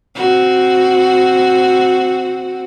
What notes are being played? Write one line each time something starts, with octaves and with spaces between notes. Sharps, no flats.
C4 F#4